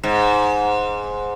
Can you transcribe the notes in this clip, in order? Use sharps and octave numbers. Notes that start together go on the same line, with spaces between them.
G#2